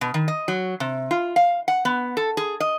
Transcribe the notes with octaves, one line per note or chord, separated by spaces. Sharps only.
B2
D#3
D#5
F#3
C3
F4
F5
F#5
B3
A4
G#4
D#5